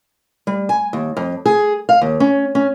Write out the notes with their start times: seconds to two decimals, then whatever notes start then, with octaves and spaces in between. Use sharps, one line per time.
0.47 G3
0.69 G#5
0.93 D#2
1.17 F2
1.46 G#4
1.89 F5
2.01 D#2
2.20 C#4
2.55 C#4